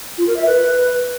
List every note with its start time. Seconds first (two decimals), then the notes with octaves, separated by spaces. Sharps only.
0.18 F4
0.27 A#4
0.36 E5
0.46 B4